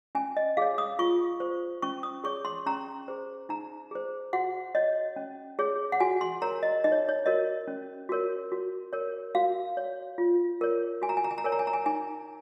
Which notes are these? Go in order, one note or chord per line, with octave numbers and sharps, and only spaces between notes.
C#4 G#5
D#5
G#4 C#5 F5
D#6
F4 C#6
C5
C#4 C#6
D#6
G#4 C#5 C#6
C6
C#4 A#5
G#4 C5
D#4 A#5
G#4 C5
F#4 F#5
C#5 D#5
C#4
G#4 C#5
F#5
F#4 G#5
C6
A#4 C#5 A#5
D#5
D#4 D#5
C#5
C#5
F#4 A#4 C#5 D#5
C#4
F#4 A#4 C#5
F#4
A#4 C#5
F#4 F5
C#5
F4
A#4 C#5
F#4 G#5
A#5
G#5
A#5
G#5
A#5
A#4 C#5 G#5
A#5
G#5
A#5
G#5
D#4 G#5